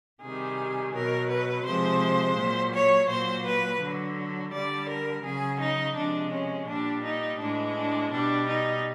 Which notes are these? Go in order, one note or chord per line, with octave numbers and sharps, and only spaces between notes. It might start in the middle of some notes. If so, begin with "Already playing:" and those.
C3 D#3 G3 G#4
B2 F#3 A#4
B4
C3 F3 G#3 C5
A#2 F#3
C#5
A#2 F#3 C5
B4
D3 F#3
D3 G3 D5
A#4
C#3 F#3 G#4
D#4
C3 F3 G#3 D4
C#4
A#2 G3 D4
D#4
A2 E3 G#3 D4
D4
B2 G3 D4
D#4